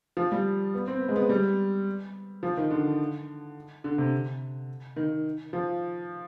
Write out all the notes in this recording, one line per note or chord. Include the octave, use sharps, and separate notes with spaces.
F3
G3
B3
C4
B3
G#3
B3
G3
F3
D#3
D3
D3
C3
D#3
F3